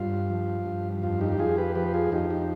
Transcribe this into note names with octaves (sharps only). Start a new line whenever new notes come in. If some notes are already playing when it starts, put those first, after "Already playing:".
Already playing: G2 F4
F3
G2
F2 F4
D#4 G4
G4
F2 F4 G#4
G4 B4
F3 G4 B4
F4 G#4
F2 D#4 G4
D#4 G4